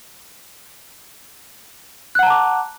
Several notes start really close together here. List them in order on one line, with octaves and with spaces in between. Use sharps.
F#6 F#5 A#5 A5 D6